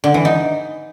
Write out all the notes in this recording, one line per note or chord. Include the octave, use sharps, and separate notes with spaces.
D3
E3
D#4